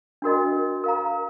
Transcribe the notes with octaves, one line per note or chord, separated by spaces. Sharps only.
D4 F#4 A#4 D#5
A#4 F5 A#5